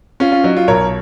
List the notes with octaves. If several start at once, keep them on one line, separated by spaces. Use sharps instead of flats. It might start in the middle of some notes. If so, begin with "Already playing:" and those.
C#4 F4
F4
F#3 D#4
F4
B1 A#4 C#5